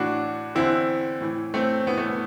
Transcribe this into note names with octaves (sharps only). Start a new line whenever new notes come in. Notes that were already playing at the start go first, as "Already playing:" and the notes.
Already playing: A2 E3 D4 F#4
E2 D3 C4 E4
A2 E3
A3 C4
A2 E3 B3
A3
B3